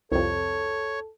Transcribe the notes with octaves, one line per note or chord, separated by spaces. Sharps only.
C2 F2 A4 C#5